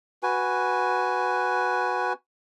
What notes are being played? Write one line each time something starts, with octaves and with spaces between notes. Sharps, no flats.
F#4 B4 G#5